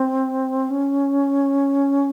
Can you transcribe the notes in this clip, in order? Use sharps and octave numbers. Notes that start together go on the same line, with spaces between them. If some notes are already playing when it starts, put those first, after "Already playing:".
Already playing: C4
C#4